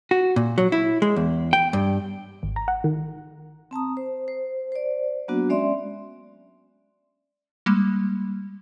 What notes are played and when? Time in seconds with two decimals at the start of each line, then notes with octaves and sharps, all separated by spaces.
0.11 F#4
0.36 A#2
0.58 F#3
0.72 E4
1.02 G#3
1.16 E2
1.53 G5
1.73 G2
2.43 G#1
2.56 A#5
2.68 F#5
2.84 D#3
3.71 C4 A5 A#5 D#6
3.97 C5
4.28 C5
4.72 C5 D5
5.28 F#3 A#3 B3 D4 F#4
5.49 G#3 C#4 D5 E5 C6
7.66 G3 G#3 A#3